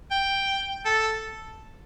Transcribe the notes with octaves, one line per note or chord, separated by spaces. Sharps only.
G5
A4